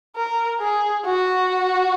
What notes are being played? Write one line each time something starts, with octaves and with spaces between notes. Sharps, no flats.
A#4
G#4
F#4